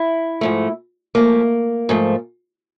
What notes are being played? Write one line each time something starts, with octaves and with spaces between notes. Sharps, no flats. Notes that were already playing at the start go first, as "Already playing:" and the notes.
Already playing: E4
G#2 F3 A3
G#2 F3 A3 A#3
G#2 F3 A3